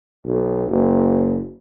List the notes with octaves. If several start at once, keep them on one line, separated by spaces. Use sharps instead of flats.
B1
F#1